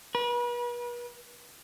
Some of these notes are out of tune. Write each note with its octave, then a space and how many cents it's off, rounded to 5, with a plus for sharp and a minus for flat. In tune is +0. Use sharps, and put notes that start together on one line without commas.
B4 -40